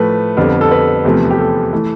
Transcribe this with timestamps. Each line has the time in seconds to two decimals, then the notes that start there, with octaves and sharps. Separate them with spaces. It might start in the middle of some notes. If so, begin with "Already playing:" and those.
Already playing: A2 F3 A3 B4
0.37 F2 D3 G3 B3
0.61 A4
0.71 B4
1.04 E2 C3 F3 A3
1.31 G4
1.38 A4
1.73 E3 A3